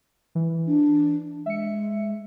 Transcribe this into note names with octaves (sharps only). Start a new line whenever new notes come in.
E3
D4
G#3 E5 C#7